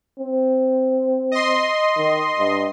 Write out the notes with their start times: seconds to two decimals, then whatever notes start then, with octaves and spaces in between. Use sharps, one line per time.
0.19 C4
1.32 D#5 C6
1.97 D#3
2.39 G2